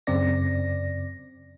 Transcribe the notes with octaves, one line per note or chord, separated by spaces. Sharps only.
F#2 C#3 C4 D5 A#6